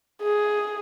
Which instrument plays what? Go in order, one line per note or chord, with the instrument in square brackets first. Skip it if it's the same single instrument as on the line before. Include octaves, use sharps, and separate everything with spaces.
[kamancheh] G#4